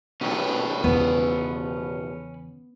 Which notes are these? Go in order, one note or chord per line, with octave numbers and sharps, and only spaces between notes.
B2 D#3 F3 C#4 B4
E2 C#3 B3